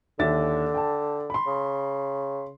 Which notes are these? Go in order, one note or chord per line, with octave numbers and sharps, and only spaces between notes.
D#2 D3 E5 A6
G5 A5
B5 C6
C#3